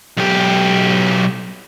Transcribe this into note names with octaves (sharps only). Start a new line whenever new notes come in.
B1 G4